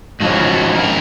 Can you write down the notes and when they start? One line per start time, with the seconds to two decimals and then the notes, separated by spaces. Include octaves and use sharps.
0.20 G#2 F3 C#4 F4 F#4
0.49 F#4
0.75 A#4